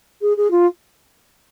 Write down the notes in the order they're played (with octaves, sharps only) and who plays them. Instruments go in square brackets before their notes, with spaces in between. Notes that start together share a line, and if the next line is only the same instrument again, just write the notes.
[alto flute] G#4
G#4
F4